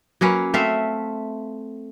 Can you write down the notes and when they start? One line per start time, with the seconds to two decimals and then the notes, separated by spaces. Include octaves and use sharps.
0.21 F#3 A#3 C#4 B4
0.54 A3 C4 E5 F5